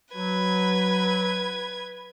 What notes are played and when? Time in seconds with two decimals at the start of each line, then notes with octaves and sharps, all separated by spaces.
0.14 F#3 B4 G#6